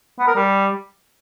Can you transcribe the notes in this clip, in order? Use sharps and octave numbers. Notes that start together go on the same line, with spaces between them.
B3
A#4
G3